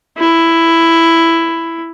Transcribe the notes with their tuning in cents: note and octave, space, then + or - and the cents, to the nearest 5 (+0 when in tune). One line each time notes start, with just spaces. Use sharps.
E4 +5